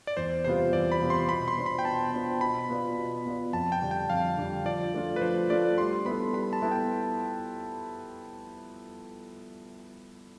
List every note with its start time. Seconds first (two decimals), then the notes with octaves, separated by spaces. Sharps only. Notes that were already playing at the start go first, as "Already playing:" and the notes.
0.07 D5
0.17 E2 C5
0.44 C3 G3 B3 F4 C5
0.72 E2 D5
0.92 B5
1.01 C3 G3 B3 F4
1.10 C6
1.29 B2 B5
1.48 C6
1.57 B3 D4 F4 C5
1.66 B5
1.79 G5
1.85 B2 A5
2.13 B3 D4 F4 C5
2.41 B2 B5
2.69 B3 F4 B4 D5
2.97 B2
3.25 B3 F4 B4 D5
3.53 F2 A5
3.72 G5
3.81 D3 G3 D4
3.91 G5
4.09 F2 F5
4.37 D3 G3 D4
4.65 F3 D5
4.94 A3 D4 F4
5.16 B4
5.21 F3 C5
5.50 A3 D4 F4 D5
5.78 G3 C6
6.05 B3 E4 A4 B5
6.33 G3 B5
6.53 A5
6.62 B3 E4 A4
6.71 G5